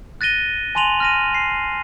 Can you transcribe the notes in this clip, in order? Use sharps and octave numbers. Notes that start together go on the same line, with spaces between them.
F#6 A6 A#6 D#7 G7
G#5 A5 C6 D#7 F7 F#7
F6 A#6 D#7
C7